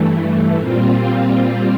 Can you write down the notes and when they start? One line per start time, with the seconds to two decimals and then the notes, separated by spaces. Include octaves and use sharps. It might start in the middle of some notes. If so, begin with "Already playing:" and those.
Already playing: G2 E3 A3
0.55 A#2 G3 C4 F4